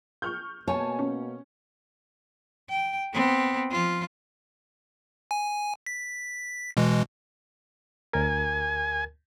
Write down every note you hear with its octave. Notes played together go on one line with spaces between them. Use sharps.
C#6 F6 G6
B2 A#3 C#5 G#5 A5
C#4
G5
B3 C4
F3 F4
G#5
B6
B2 E3 G#3
D2 A#4 G#5